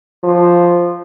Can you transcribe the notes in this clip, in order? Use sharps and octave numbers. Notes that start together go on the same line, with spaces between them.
F3